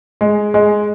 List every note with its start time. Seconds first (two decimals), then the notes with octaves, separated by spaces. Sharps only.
0.21 G#3
0.54 G#3